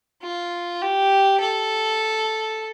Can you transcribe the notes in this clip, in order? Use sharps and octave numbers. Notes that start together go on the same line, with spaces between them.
F4
G4
A4